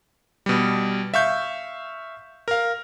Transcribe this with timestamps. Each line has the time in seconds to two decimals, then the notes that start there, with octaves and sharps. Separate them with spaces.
0.46 B2 G3
1.14 E5 F5 C#6 G6
2.48 A#4 F5